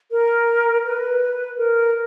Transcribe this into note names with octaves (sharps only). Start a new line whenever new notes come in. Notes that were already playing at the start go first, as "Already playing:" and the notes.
A#4
B4
A#4